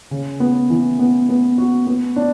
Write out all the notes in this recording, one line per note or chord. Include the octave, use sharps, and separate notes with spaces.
C#3
B3
E3
B3
B3
F#4
B3
D4